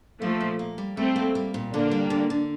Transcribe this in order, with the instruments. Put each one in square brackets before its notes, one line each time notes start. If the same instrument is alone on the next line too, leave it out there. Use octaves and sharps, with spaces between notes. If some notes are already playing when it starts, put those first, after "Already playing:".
[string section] F3 A3 [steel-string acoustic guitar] A#3
[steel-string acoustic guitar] A#2
A#3
G3
[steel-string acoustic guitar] G3 [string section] A3 C4
[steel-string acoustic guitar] A#3
G3
A#2
[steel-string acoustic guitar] D3 [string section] A#3 D4
[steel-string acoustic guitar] G3
D3
D3